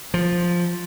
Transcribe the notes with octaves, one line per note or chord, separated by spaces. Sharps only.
F3